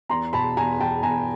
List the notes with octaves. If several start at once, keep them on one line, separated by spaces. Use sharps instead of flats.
E2 A#5 C6
B2 A5 B5
E2 G#5 A#5
E2 G5 A5
E2 G#5 A#5